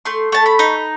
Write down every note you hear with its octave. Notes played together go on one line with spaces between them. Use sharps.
A3 C6
A3 A5
B5
D#4